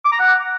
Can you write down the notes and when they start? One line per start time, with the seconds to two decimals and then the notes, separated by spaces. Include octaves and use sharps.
0.05 D6
0.12 A#5
0.19 F#5